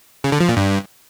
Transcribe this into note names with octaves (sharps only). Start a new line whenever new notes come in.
C#3
D3
F3
A#2
G2